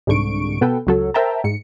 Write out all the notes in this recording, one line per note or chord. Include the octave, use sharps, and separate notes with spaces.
C2 G#2 D3 C#6 D7
B2 B3 A4 B4 G5
C#2 F#3 A4
A#4 C5 E5 G5 A5 A#5
G#2 C#7